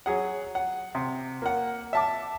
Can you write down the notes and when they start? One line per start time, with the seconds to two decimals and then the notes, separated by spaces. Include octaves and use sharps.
0.06 F#3 G#4 F#5
0.55 F#5
0.95 C3
1.42 A#3 F#5
1.93 E5 A5 D6